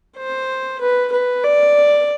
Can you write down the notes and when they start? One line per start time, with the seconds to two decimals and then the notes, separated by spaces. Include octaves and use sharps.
0.17 C5
0.80 B4
1.12 B4
1.44 D5